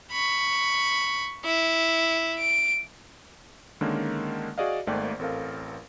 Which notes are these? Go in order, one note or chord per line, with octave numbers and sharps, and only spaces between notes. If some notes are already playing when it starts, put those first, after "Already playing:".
B5 C#6
E4
D7
D3 D#3 G#3 A#3 C#4
F#4 G#4 D5 D#5 F5
G#1 G#2 A3 A#3 D5 G5
A1 C4 A4 A#4 F5